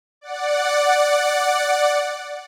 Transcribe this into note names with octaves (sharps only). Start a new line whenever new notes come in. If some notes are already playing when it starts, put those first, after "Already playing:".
D5 F#5